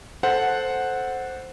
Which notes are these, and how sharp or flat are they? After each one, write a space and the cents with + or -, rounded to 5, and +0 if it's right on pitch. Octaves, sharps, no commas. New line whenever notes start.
A4 +0 C5 +0 F#5 -5